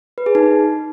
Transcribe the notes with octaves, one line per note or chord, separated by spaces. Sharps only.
B4
G#4
D#4